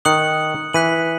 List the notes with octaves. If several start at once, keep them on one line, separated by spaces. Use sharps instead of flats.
D#3 D#6 F#6 C#7 F#7
E3 F#6 B6 D#7 F#7